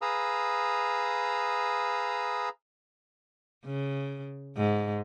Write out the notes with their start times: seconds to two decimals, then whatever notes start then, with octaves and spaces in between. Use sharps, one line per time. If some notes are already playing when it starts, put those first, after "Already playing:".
0.02 G#4 B4 F5 A#5 D#6 E6
3.65 C#3
4.57 G#2